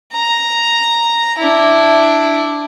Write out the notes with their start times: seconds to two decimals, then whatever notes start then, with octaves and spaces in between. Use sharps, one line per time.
0.13 A#5
1.38 D4 E4